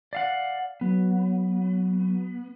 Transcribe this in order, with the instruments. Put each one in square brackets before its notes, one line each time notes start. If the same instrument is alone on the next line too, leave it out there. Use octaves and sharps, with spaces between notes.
[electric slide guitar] D5 F5 F#5
[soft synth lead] F#3 [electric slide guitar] B3